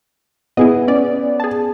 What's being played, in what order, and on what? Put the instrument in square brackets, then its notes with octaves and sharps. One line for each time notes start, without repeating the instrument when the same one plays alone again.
[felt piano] B3 [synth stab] E4 G#4 D#5
[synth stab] C#4 D5
G#4 A5